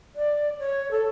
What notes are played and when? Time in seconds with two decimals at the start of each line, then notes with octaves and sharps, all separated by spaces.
0.16 D5
0.59 C#5
0.91 A4